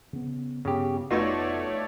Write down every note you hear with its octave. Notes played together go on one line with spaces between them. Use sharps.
C#3 B3
G2 C#3 B3 G4
F1 B2 A3 D#4 F4 F#4 C#5 D5